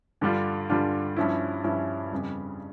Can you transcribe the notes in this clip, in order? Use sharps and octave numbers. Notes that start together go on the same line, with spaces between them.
G2 D3 G3 D4 F4
G2 D3 G3 D4 F4
G2 F3 C#4 E4
G2 F3 C#4 E4
F2 C#3 G3